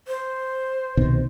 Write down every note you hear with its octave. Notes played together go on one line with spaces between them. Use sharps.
C5
C2 B2 D#3